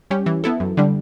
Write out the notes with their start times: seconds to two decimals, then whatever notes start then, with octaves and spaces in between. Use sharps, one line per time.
0.11 G3 C#4 G4
0.26 E3
0.44 B3 E4 A4
0.60 F#2
0.77 D3 G3 D4